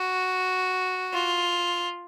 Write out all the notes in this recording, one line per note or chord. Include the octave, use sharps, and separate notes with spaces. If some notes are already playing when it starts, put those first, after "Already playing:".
Already playing: F#4
F4